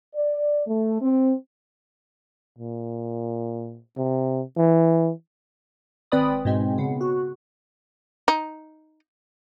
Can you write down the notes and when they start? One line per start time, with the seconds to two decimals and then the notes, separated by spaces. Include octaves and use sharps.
0.14 D5
0.67 A3
1.01 C4
2.59 A#2
3.97 C3
4.57 E3
6.12 G#1 C4 B4 D5 B5 D#6
6.45 G#2 B2 G#3 C4
6.78 C#3 B3
7.01 F#4
8.28 D#4